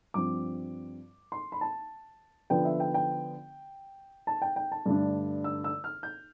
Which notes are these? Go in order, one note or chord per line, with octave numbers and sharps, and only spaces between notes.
G2 F3 C4 D6
C6
B5
A5
D3 F3 B3 G5
E5
G5
G5
A5
G5
G5
A5
G2 D3 A3 D4
E6
E6
F6
G6